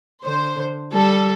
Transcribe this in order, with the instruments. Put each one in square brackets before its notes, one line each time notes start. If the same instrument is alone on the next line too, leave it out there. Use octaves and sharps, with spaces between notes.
[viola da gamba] D3 [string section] C5
[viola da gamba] G3 [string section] A4